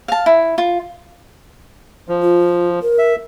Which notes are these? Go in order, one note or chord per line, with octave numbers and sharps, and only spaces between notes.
F5 A5
E4
F4
F3
F4
A#4
E5